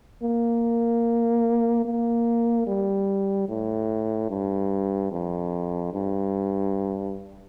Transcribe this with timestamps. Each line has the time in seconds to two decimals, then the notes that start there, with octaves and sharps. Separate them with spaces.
0.23 A#3
1.85 A#3
2.67 G3
3.49 A2
4.30 G2
5.12 F2
5.93 G2